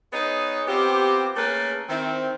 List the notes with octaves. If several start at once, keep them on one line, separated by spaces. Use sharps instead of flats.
B3 D#4 G#4 B4 C#5 D#5
B3 C4 F4 G4
A3 A#3 C#4 G#4 A#4 B4
D#3 C4 E4